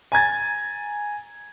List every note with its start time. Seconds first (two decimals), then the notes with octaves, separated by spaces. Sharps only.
0.12 G#5 A#5 G#6 A6